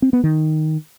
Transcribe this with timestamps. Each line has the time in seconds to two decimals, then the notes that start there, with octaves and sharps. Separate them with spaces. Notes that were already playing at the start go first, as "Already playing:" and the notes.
0.02 C4
0.13 B3
0.24 D#3